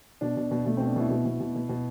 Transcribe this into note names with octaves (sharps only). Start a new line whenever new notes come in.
B2 D4
B2
B2
B2 A3
B2 C4
D4
B2 E4
B2
B2
B2
B2
B2